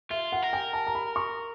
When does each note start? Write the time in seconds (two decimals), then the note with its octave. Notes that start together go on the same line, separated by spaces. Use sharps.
0.10 F4 E5
0.32 F#5
0.42 A#4
0.53 G5
0.73 A5
0.87 A#5
0.95 B5
1.16 C#6